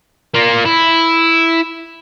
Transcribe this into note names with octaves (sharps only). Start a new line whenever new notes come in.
A#3 F4
E4